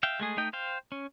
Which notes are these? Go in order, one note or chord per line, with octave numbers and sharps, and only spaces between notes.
E5 F5 G5
G#3 A3 G#4
A3 D#4 D#5 G5
C5 F5 G5
C#4